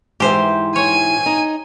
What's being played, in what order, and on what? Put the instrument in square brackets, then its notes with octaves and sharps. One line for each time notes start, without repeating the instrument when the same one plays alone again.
[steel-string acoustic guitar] G#2 E3 [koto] G4 C5
[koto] C#5 [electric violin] G#5
[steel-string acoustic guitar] D#4